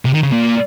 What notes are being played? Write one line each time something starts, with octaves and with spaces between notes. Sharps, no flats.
C3
D#3
C#3
A#2